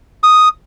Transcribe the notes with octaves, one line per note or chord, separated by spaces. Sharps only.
D#6